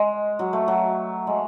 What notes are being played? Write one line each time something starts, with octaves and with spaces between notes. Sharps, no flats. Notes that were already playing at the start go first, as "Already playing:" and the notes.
Already playing: G#3
F#3
A3
F#3
G#3